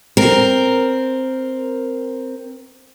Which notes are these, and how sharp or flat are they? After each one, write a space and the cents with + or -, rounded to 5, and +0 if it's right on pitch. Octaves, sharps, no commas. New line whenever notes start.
C4 +0 A#4 +0